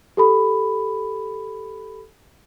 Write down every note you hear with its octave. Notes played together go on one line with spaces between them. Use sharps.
G4 A4 B5